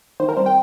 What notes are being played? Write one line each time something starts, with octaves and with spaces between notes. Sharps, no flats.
D#3 C5
A#4
G3 C4 C5
G5